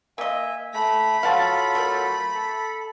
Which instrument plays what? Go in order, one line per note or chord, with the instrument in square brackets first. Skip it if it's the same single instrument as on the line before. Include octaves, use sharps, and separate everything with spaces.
[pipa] A#3 D#5 [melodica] E5 G#5
[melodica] A3 [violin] B5 B6
[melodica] F#3 F4 A4 [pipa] F5 F#5 A5
[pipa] A3 A#4
[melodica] A4